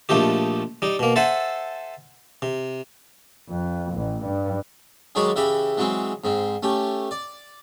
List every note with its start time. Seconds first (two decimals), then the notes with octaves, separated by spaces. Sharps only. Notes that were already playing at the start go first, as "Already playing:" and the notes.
0.09 A#1 F3 A3 D#4 G4
0.82 G3 D#4
0.99 B2 A#3
1.16 A4 C5 E5 F#5 G#5
2.42 C3
3.49 F2
3.94 A1
4.24 G2
5.15 D#3 F#3 G#3 C#5 D5 B5
5.36 C#3 E3 G4 E5 B5
5.78 E3 F#3 G#3 C4
6.24 G#2 C4
6.63 A3 C#4 G4
7.11 D5